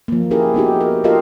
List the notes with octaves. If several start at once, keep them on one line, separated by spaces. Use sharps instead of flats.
F3 A#3
C#4 E4 G4 G#4 A#4
B3 D#4 F#4 G4
A#4
F4 G4 A4 A#4 D#5 F5